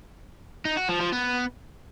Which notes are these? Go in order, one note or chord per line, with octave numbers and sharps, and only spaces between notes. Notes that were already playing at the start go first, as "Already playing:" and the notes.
D#4
F#4
F3
F3
B3